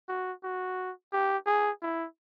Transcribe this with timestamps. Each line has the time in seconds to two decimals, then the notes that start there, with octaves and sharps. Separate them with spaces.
0.09 F#4
0.44 F#4
1.13 G4
1.46 G#4
1.82 E4